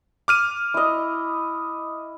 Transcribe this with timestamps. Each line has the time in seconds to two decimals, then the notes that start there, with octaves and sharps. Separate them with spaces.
0.28 D6 F6 D#7
0.74 E4 D#5